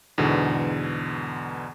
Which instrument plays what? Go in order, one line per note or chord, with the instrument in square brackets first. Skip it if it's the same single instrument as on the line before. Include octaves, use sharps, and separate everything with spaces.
[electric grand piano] E2 G#2 B2 D3